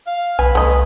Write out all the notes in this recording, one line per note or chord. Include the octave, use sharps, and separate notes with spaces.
F5
B1 B4 G#5
C2 A3 D#5